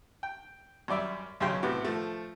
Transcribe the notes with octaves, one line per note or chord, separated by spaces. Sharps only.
G5
F#2 G3 D5 E5
B1 F#2 C#3 C#4 G5 C6
A2 C3 B3 F#4
F3 A3